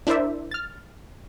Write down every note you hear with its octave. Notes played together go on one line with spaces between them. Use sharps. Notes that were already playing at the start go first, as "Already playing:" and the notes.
D4 E4 A#4 C5 D5 E5
F6 A6